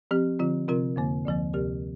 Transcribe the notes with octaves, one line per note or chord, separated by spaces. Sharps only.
F3 C4 G4
D3 F3 C4 F4
C3 F3 C4 F4 A#4
F2 D3 A#3
D2 D3 F3 A#3
D2 C3 A#3 G4 A#4